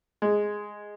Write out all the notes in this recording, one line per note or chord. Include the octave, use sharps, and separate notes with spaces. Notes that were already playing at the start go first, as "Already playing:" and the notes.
G#3